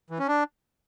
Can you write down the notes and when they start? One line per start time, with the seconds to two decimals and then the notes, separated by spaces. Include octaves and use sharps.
0.10 E3
0.19 C#4
0.28 D4